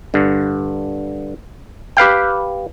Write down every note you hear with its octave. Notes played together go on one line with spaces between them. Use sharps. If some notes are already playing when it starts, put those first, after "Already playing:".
G2 D3
G4 B4 F5 G5